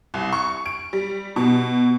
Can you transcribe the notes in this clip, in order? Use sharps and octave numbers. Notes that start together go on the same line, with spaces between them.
C2
C#6
D7
G3
B2